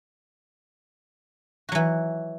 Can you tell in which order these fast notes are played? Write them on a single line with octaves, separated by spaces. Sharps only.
F#4 F#3 E3